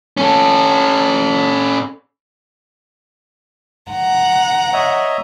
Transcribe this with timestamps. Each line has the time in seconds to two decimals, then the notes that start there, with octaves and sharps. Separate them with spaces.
0.17 C#4 A4
3.91 F#5 A#5
4.73 C#5 D#5 E5